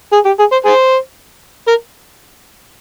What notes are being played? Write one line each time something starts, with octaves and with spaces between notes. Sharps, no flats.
G#4
G4
G#4
C5
G#4 C5
A#4